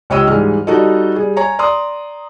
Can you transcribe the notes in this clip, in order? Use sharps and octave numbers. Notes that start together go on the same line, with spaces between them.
C#2 G4 C#5 D#5 E6 D#7
G#2 E3 G3 G#4 F6
G3 D#4 F#4 A4 D#5
G3 G#4
C#5 G#5 A#5
D5 A#5 C6 D#6